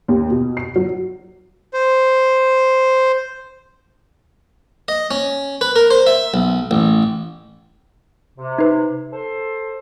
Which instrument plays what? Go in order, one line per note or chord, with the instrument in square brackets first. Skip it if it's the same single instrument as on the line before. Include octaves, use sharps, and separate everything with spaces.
[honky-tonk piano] D#2
B2
C7
F#3
[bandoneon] C5
[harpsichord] D#5
C#4
B4
A#4
C5
E5
B1
A1
[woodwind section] C3
[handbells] D#4 B4
[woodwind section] A4 C5